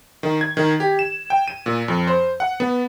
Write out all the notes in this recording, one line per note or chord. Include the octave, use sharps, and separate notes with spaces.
D#3
G#6
D#3
G4
E7
G5
D#7
A#2
F2
C5
F#5
B3